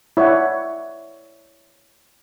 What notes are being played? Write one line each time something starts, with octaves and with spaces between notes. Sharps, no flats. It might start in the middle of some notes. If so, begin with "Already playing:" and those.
E4 C#5 D5 E5 F#5